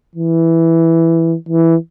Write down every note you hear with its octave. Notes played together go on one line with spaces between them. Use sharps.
E3
E3